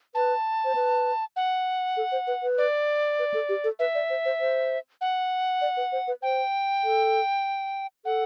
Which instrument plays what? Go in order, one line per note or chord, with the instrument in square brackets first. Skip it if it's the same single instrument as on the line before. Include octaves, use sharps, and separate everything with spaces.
[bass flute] B4 [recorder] A5
[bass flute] C5
B4
[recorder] F#5
[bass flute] A4
C5
B4
B4
[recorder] D5
[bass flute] B4
A4
G4
A4
[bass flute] B4 [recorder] E5
[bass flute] D5
C5
C5
C5
[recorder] F#5
[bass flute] D5
B4
C5
B4
[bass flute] C5 [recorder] G5
[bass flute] A4
[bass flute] A4 [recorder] F#5